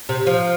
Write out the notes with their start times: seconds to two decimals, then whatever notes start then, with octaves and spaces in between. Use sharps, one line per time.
0.09 C3
0.27 F3